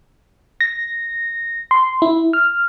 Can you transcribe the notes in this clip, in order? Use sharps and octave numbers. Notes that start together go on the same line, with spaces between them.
A#6
C6
E4
F6